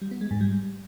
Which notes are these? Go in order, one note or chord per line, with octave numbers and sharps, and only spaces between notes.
G3
B3
G#3
G#2
G3